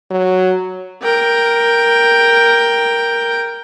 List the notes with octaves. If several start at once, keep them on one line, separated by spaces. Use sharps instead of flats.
F#3
A#4 G5